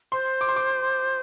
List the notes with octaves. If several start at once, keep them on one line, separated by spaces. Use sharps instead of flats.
C5 C6
D6
C6
D6